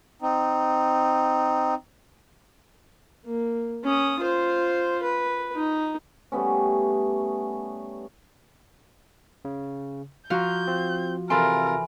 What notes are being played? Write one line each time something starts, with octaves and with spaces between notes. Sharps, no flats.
C4 D#4
A#3
C#4 D#6
F4 C5
B4
D#4
G3 A3 B3 C#4
C#3
F3 F#4 A#5 F6 G6
C4 F4
C3 E3 F4 A4 A#4 G#5 B5 C6